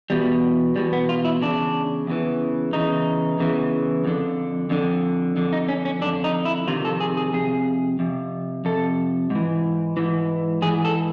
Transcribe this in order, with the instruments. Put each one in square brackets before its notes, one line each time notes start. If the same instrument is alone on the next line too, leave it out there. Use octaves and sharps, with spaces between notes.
[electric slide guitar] E2 B2 G3
E2 B2 G3
B3
F4
E4
E2 C#3 D4
E2 C#3 E3
E2 C#3 E3 D#4
E2 C#3 E3
F2 D3
F2 D3
F2 D3
D#4
C#4
C#4
D3 D4
F2
D#4
E4
F2 C3 D#3 F4
A4
G#4
G#4
F2 C3 G#4
F2 C3
F2 C3 A4
G#2
E3
G#2 E3
G#2 E3 G#4
A4